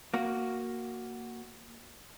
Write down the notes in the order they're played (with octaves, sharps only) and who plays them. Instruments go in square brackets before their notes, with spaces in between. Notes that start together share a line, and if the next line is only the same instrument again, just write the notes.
[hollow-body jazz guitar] A#3 F#4